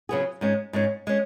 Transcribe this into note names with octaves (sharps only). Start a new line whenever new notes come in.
C#3 F#3 B3 G#4
G#2 G#3 C#4
G#2 G#3 C#4
G#3 C#4